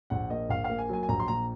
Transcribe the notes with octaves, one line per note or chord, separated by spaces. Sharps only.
A#1 F#5
A#3 D#5
A#1 F5
F5
A#3
G#5
F#3 G#5
G#5
A#1 A#5
C6
A#2 A#5